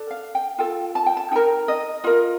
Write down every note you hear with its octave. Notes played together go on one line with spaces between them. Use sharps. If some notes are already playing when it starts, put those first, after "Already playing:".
Already playing: D4 A4
F5
G5
F4 A4 G5
A5
G5
A5
D#4 A#4 G5
D#5
F4 A#4 D#5